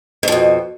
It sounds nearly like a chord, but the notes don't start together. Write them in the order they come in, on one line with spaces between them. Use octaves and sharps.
G#2 F2 B2